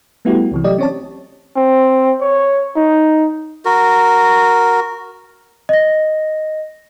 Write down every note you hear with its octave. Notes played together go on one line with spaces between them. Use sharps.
G3 A3 B3 E4 F#4 G4
C2 C3 E3
F#3 A3 G4 D5 D#5
C4 C#4 C#5 D5 A5
C4
C#5
D#4
F#4 A#4
D#5 A#6